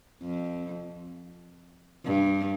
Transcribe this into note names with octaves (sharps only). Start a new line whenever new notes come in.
F2
G2